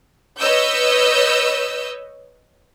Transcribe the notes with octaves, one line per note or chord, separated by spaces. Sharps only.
B4 C#5 D#5 E6 G6